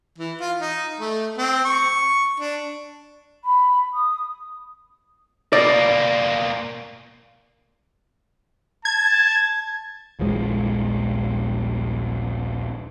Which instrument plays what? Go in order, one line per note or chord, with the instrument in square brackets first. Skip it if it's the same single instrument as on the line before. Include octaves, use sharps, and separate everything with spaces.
[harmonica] E3
F4
D#4
A3
C4
C#6
D4
[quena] B5
D#6
[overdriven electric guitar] B2 A#3 [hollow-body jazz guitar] D5
[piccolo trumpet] A5 [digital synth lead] G#6
[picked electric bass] D#1 A#1 F3 G#3